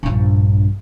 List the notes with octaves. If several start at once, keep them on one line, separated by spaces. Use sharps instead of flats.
A#1 G2